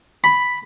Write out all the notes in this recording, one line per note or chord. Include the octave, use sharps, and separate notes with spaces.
B5